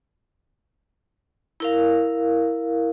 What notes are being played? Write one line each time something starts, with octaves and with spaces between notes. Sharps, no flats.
E4 A#4 F5